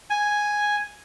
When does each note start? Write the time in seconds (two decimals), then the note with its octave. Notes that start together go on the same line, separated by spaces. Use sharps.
0.10 G#5